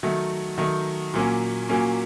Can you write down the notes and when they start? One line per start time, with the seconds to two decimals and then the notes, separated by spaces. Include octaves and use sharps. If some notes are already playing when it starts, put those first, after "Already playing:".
0.03 D#3 F#3 A3
0.58 D#3 F#3 A3
1.14 A#2 F#3 A#3 C#4
1.69 A#2 F#3 A#3 C#4